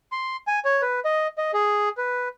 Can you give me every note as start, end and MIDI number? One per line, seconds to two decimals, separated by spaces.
0.12 0.37 84
0.47 0.59 80
0.65 0.81 73
0.82 1.00 71
1.05 1.27 75
1.38 1.51 75
1.53 1.89 68
1.97 2.28 71